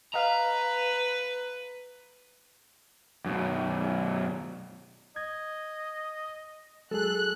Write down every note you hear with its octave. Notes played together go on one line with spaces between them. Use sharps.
B4 D#5 F5 A#5
F#2 B2
D#5 G#6
F#3 G#3 G#4 A4 F#6